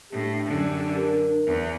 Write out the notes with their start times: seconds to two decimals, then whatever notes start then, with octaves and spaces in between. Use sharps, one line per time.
0.12 A2 D4 G4
0.46 F#2 D3
0.97 A#4
1.47 E2